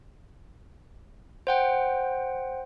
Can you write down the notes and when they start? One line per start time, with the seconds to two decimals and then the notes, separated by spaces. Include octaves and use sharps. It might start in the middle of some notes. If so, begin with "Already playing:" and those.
1.47 C5 F#5 G5